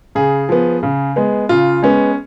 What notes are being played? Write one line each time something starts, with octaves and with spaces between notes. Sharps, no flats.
C#3 G#4
F3 B3
C#3
G#3 B3
C#3 F4
G#3 B3 C#4